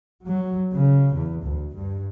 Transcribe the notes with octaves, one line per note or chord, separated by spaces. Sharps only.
F#3
C#3
E2
D2
G2